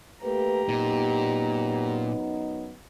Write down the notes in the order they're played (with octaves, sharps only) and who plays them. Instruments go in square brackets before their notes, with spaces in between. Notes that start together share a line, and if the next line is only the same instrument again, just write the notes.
[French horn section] A3 A#3 B4 [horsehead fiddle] G4 A#5
[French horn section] F#2 B3 D#4 [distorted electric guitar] A#2